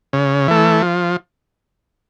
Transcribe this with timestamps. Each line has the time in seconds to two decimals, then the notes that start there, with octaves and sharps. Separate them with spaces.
0.13 C#3
0.48 E3 A3
0.82 F3